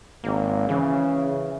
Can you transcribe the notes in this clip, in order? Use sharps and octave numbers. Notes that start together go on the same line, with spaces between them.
G#1 A#3
C#3 E3